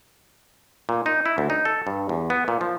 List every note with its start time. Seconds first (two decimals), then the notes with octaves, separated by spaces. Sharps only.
0.89 A#2
1.06 D#4
1.26 E4
1.38 D2
1.50 D#4
1.65 A4
1.87 G2
2.09 E2
2.30 B3
2.48 A#2
2.61 F3